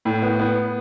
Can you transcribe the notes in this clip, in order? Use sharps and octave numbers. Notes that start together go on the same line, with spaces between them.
A2
B3
B3